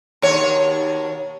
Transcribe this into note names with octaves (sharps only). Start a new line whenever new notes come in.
D#2 B2 C#5